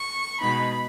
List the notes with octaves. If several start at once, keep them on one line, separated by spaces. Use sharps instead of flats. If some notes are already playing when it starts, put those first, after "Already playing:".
Already playing: C#6
B2 G#3 B3 D#4 B5